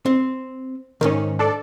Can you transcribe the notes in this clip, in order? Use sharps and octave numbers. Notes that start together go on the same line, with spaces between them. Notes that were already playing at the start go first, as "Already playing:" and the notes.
C4
C#2 G#2 D#3 C#4
D4 A4 D5